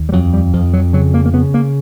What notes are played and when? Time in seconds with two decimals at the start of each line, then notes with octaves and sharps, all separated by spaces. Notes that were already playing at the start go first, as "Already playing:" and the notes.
Already playing: D#2
0.09 G3
0.12 F2 F#3
0.33 G3
0.54 F2 F3
0.73 F#3
0.93 C#3 F#3
1.14 A#3
1.26 A#3
1.34 C#3 B3
1.54 A#3